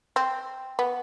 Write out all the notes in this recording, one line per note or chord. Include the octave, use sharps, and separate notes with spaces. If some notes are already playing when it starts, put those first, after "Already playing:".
C4
B3